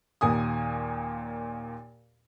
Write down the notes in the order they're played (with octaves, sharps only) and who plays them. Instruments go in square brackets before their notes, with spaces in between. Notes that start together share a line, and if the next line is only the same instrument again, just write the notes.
[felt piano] D#2 A#2 G#5 D#6